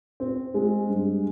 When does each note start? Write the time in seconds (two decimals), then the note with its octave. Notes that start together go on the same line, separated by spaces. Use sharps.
0.20 C4
0.54 G#3
0.89 G2